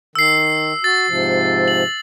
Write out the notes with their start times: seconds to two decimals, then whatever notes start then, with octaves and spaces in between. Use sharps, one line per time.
0.15 D#3 E6 C7
0.84 F#4 A6
1.08 G#2 C3 F3
1.68 F#7